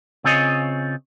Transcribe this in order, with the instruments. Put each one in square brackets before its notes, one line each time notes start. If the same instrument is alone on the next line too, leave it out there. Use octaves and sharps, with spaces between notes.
[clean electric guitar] C#3 C4 F4 G#4 C#5 D#5